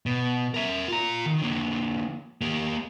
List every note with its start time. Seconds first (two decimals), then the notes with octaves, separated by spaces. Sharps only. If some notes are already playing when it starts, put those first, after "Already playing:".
0.06 B2
0.54 A#4 E5
0.88 F4 A#5
1.26 D#3
1.42 D3 A#3
2.41 A#3 G4